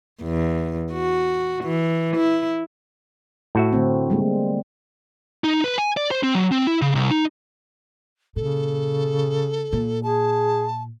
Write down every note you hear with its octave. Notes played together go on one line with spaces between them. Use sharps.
E2
F#4
E3
E4
A2 F#4 E5
D3 A3 C4
G3 G#3 A#3
D#4
B4
G#5
D5
C5
C4
F#3
C4
E4
C#3
C2
D#4
A#2 C#3 A4
A#2
G#4 A5